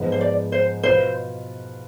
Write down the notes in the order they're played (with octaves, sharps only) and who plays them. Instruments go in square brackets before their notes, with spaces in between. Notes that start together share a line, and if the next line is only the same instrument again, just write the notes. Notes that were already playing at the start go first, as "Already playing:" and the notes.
Already playing: [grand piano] G#2 F3 G#3 B3
[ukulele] C5
D5
C5
[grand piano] B2 B3 F4 B4 [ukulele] C5